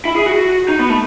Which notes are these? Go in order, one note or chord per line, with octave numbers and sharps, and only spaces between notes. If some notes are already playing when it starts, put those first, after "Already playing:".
E4
G#4
F#4
D#4
B3
A3